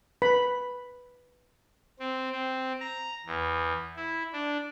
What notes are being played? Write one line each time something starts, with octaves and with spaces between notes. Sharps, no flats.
B4 B5
C4
C4
A#5
E2
E4
D4